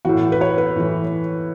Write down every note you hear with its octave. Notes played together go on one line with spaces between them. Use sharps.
A2 E3 F#4
B4
C#5
B4
A2 E3